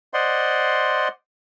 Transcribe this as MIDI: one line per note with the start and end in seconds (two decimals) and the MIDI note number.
0.14 1.08 72
0.14 1.08 74
0.14 1.08 75
0.14 1.08 78
0.14 1.08 84